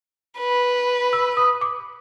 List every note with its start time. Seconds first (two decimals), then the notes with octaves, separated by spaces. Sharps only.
0.39 B4
1.13 E6
1.37 D#6
1.61 D6